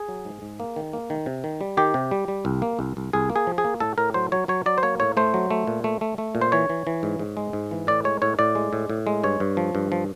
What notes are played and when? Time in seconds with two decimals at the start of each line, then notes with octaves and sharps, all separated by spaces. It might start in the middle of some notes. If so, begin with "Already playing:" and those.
Already playing: G#4
0.09 F#3
0.25 G#2
0.42 G#2
0.60 A#3
0.76 D#3
0.93 A#3
1.10 D#3
1.26 C3
1.44 D#3
1.61 G3
1.77 D#3 G4
1.94 C3
2.11 G3
2.28 G3
2.45 C2
2.62 A#3
2.79 C2
2.97 C2
3.13 C2 G#4
3.30 A#3
3.36 G#4
3.47 F3
3.58 G#4
3.64 A#3
3.80 A2 A4
3.98 A2 A#4
4.14 F#3 C5
4.32 F#3 C#5
4.48 F#3 C#5
4.66 F#3 D5
4.78 C5
4.83 A#3 C#5
5.00 A2 C#5
5.17 A3 C5
5.34 F#3
5.51 A3
5.67 A#2
5.84 A3
6.01 A3
6.18 A3
6.35 A#2
6.41 C5
6.52 E3 C#5
6.70 E3
6.87 E3
7.03 G#2
7.19 G#2
7.37 G#3
7.53 G#2
7.71 E3
7.87 A2 D5
8.04 G#3 C#5
8.22 A2 C#5
8.39 A2 D5
8.55 G#3
8.73 A2
8.90 A2
9.07 G#3
9.24 G2 C#5
9.40 G2
9.57 F3
9.75 G2
9.92 F3